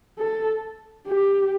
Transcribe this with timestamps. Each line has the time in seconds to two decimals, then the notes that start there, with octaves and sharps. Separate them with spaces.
0.19 A4
1.07 G4